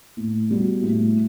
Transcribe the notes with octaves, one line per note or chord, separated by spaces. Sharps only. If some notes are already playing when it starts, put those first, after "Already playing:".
A2
G3 B3 F#4
A2